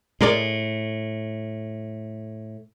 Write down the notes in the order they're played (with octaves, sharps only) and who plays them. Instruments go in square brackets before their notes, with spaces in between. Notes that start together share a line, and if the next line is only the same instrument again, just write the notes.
[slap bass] A2 [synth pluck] G#3 A#4 D5